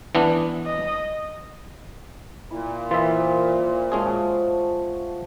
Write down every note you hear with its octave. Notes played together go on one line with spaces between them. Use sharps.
E3 B3 D4
D#5
A#2 E4
E3 F4 C5 E5 B5 D#6
F3 G#3 C#4 F#4 G#4 A5